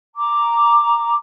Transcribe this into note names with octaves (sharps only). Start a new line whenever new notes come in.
A#5 D6